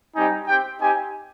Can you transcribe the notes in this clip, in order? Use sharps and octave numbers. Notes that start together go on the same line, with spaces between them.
G3 C4 D#4 G4 G#5
C4 G4 G5
C4 D#4 G4 G#5